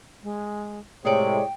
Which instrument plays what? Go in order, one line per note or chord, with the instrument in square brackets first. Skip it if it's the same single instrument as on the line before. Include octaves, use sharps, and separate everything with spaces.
[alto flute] G#3
[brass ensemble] A2 C3 G#3 [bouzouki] G#4 C#5 D5 [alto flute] G5